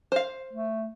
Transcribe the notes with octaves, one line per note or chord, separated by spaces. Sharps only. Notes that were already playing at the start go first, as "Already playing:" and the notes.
C5 F5
A3